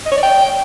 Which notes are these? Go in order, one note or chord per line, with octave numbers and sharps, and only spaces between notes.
D#5
C#5
D5
G5